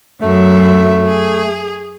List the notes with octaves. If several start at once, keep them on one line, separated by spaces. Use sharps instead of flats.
F#2 F#3 A3 E5
G#4